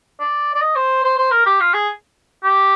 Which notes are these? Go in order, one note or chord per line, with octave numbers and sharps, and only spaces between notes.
D5
D5
D#5
C5
C5
C5
A#4
G4
F4
G#4
G4